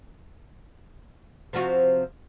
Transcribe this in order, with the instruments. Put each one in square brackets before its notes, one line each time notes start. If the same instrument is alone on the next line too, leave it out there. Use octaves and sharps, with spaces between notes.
[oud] C3 F3 F#4